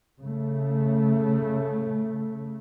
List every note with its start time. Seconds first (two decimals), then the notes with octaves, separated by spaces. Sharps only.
0.20 C#3 A3